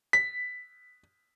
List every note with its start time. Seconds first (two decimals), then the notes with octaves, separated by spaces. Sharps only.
0.13 B6